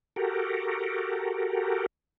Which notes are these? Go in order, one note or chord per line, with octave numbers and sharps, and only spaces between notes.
F#4 G4 A4 A#4